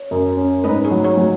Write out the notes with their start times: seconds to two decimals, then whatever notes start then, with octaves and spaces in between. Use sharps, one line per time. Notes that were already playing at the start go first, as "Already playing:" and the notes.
Already playing: C#5
0.11 F#2
0.37 C#4
0.64 G#2 B4 D#5
0.85 G#4 C#5
0.91 F#3
1.04 G#4 C#5
1.17 F#3